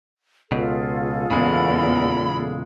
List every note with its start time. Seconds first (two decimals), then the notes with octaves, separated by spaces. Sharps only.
0.52 C#2 B2 F4 G#4 A4
1.31 E2 A#2 C#3 G#3 B5